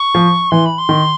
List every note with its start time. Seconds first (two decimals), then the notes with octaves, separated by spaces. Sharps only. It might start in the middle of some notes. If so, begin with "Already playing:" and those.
Already playing: C#6
0.15 F3
0.51 E3 C6
0.65 B5
0.78 C6
0.89 D#3